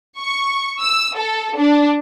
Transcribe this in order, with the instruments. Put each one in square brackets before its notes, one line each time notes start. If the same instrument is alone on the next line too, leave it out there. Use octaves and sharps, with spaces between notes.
[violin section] C#6
E6
A4
D4